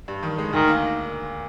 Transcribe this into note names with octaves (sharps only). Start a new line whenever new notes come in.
G2
D#3
G#3
D2 D#3
A#3